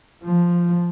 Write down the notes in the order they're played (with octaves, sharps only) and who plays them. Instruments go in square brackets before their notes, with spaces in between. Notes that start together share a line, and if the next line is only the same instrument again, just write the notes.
[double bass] F3